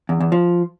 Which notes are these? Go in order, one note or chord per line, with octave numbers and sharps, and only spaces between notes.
E2
E2
F3